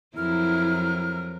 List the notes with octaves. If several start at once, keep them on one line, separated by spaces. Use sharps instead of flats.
F2 F#3 E4 A#4 F6